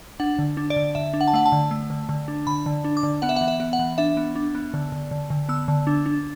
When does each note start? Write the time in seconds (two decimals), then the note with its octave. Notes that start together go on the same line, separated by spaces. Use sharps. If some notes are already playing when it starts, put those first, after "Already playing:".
0.20 D4 F#5
0.39 D3
0.57 D4
0.70 D5
0.76 D3
0.95 D3 E5
1.14 D4
1.21 F#5
1.28 A5
1.34 A3 F#5
1.46 A5
1.52 D3
1.71 A3
1.90 D3
2.09 D3
2.28 D4
2.47 D3 B5
2.66 D3
2.85 D4
2.97 D6
3.03 D3
3.22 B3 F#5
3.29 E5
3.36 F#5
3.41 E3
3.48 E5
3.60 B3
3.73 F#5
3.79 E3
3.98 D4 E5
4.17 B3
4.36 D4
4.55 B3
4.74 D3
4.92 D3
5.11 D3
5.30 D3
5.49 B3 E6
5.68 D3
5.87 D4
6.06 D4